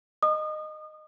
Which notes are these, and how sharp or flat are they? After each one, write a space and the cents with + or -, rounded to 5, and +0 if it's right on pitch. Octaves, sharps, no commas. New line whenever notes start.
D#5 -15 D#6 -35